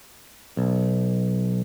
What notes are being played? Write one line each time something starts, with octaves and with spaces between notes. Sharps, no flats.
B1